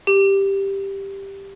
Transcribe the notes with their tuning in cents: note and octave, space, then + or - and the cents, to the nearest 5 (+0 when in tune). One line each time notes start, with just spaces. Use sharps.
G4 +5